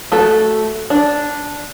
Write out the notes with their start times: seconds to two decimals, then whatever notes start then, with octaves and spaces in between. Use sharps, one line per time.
0.12 A3 F#4 A4
0.90 D4